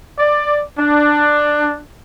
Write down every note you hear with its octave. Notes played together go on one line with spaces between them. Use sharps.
D5
D4